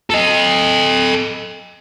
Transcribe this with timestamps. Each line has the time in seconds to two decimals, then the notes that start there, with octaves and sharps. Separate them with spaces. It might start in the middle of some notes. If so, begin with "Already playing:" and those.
0.10 A4 D#5